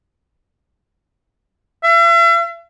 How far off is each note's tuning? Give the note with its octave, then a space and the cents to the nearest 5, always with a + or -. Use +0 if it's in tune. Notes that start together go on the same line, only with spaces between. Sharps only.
E5 +45